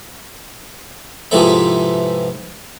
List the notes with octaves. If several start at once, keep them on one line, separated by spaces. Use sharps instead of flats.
G#2 C3 E3 F3 A4 E5